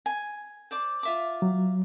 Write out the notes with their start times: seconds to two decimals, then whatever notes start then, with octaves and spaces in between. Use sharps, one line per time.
0.06 G#5
0.71 C5 D5 D6
1.03 F4 E5 D6
1.42 F#3